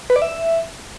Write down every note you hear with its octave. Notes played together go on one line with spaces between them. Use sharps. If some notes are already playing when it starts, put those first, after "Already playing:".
B4
D5
E5